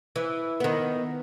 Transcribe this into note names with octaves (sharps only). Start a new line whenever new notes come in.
E3
D#3 B3